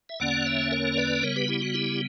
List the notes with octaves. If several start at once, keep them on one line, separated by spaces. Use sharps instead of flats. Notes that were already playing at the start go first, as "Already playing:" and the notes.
E5
E2 D3 A#3 C#4 D5 F#5
C#5 E5
A#4 C#5
B4 D5
C#3 G3 B3 A#4 C#5
G4 B4
E4 G4
F#4
E4 G4